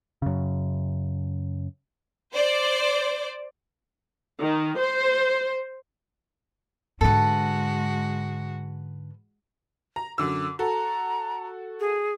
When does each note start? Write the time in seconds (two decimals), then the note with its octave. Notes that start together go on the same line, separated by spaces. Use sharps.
0.22 F#2 C#3
2.33 C5 D5
4.40 D#3
4.79 C5
7.01 G#2 D3 G#3 F#4 A4 B4
9.96 A#5
10.18 F#2 D3 D6 E6
10.59 F#4 A4 A#5
11.80 G#4